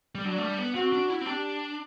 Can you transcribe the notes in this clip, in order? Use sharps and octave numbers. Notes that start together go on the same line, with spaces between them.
G3
F#3 D4
A3
G3
B3
C4 F#4
D4
E4
C4
D4 G4